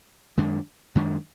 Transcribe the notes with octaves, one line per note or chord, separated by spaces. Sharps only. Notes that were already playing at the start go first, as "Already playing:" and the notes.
F#2 D#3 G#3 D4
F#2 D#3 G#3 D4